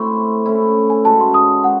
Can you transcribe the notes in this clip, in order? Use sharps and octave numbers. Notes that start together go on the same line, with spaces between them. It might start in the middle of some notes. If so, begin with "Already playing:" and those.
Already playing: A2 A3 C4 E4 C#6
A3 C#4 E4
G#5
E3 G#3 C#4 F#4 A5
C6
D#6
D#3 G#3 F#5